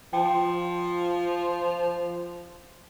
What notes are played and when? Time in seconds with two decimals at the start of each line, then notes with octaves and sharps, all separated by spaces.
0.13 F3 G5